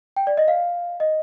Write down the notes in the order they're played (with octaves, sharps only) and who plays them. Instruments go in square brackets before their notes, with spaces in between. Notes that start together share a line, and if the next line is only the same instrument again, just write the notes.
[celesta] G5
D5
D#5
F5
D#5